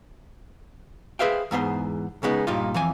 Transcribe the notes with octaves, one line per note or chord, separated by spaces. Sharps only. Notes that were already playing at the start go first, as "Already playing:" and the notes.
G#4 B4 C5 E5 F5 G5
E2 G#2 B3 C5
C#3 G#3 B3 D#4
G2 A#2 D#4 F4
F2 E3 G#5